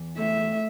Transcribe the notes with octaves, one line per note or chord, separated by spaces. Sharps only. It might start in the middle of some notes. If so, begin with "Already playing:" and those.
Already playing: E2
A3 E5